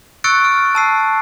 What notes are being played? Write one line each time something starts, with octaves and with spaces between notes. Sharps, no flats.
C#6 E6 F#6 A6 C#7 D7
F6
A5 E6 C7